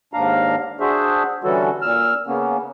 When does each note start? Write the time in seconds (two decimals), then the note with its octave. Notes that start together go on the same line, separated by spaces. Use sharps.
0.13 D#2 G#2 D4 F5 A#5
0.80 D4 F#4 G#4 C5 E5
1.44 D3 E3 G3 C#4 F#4 A4
1.82 A#2 E6 F6
2.27 C#3 A#3 B3 C#4